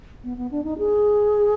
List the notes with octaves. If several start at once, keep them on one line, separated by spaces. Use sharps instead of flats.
B3
B3
D4
D#4
G#4